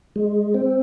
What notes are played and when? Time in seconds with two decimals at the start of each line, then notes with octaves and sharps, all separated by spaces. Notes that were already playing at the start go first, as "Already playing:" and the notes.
0.16 G#3
0.54 C4